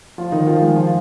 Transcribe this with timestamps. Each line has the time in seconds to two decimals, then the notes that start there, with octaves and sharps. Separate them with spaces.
0.18 F3 F4
0.32 D#3 D#4
0.47 F3 F4
0.61 G#3 G#4
0.76 F3 F4